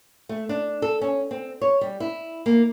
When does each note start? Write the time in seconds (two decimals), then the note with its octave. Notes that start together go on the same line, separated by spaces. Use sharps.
0.29 A3
0.49 D4
0.82 A4
1.01 C#4
1.31 C4
1.61 C#5
1.81 G3
2.00 E4
2.46 A#3